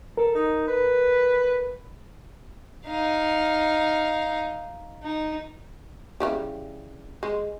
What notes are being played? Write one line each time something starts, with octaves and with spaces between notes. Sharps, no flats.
A4 A#4
D#4
B4
D#4 F5
D#4
C#3 E3 G3
G#3